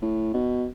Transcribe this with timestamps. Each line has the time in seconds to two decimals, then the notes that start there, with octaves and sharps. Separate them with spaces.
0.02 A2
0.34 B2